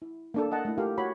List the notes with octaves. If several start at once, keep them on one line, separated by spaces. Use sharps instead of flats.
E4
A#3 D4 A4
A#4 D#5 F#5 A5
A3 E4
F4 G4 A4 A#4 F5
F#4 C#5 B5